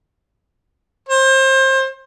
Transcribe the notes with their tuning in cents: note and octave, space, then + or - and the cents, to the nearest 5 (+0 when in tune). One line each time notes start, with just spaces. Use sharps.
C5 +30